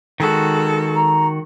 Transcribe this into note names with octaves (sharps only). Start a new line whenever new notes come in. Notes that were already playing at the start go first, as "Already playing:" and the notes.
D#3 G#3 F#4 A4
A#5